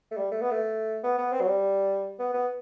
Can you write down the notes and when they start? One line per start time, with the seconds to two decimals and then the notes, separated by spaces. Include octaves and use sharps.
0.11 A3
0.17 G3
0.31 A3
0.41 B3
0.51 A3
1.03 B3
1.18 B3
1.32 C4
1.41 F#3
1.47 G3
2.19 B3
2.33 B3